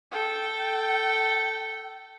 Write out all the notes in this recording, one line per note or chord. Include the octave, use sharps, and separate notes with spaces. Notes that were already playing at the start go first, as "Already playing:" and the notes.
A4 G5